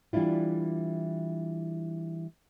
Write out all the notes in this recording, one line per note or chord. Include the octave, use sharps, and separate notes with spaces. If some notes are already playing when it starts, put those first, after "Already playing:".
E3 G3 D4 E4 F4